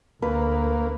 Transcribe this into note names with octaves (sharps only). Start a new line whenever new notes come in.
D2 A#3 B4